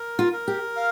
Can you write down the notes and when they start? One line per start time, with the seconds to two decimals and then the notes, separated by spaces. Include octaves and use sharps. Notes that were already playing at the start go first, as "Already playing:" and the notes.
Already playing: A#4
0.19 F4
0.33 A#4
0.48 G4
0.76 F5